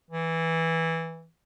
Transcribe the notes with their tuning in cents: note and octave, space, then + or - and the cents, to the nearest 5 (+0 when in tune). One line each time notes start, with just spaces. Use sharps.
E3 -10